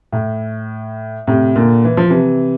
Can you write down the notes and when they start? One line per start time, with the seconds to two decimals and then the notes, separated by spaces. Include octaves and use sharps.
0.12 A2
1.27 A2 C3
1.56 A#2 D3
1.84 E3
1.97 F3
2.10 C3 E3